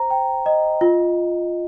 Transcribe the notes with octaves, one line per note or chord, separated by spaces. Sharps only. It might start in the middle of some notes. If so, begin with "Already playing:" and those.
Already playing: C5 A#5
G5
D#5
F4